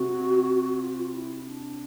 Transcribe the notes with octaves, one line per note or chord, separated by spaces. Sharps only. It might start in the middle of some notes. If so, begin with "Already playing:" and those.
Already playing: C3 F#4
F4
E4
D4